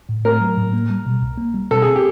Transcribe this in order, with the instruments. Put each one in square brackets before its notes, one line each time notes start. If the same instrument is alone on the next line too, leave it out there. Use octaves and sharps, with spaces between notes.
[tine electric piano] A2
[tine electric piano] A3 [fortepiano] A#4
[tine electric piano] F#3
A2
A#3
G3
B2
C2
A#3
G3
[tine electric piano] B2 [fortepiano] A4
[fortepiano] G#4
G4